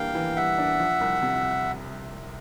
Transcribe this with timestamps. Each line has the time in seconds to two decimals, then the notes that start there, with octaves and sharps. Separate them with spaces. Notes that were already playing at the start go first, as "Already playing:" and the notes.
Already playing: E3 G3 A#3 D4 F5 G5
0.15 E3
0.36 G3 E5 F#5
0.58 D4
0.79 F3
1.00 C2
1.22 C3